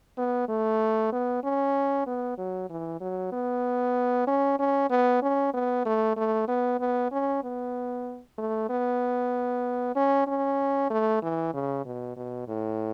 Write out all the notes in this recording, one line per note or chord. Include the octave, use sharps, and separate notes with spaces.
B3
A3
B3
C#4
B3
F#3
E3
F#3
B3
C#4
C#4
B3
C#4
B3
A3
A3
B3
B3
C#4
B3
A3
B3
C#4
C#4
A3
E3
C#3
B2
B2
A2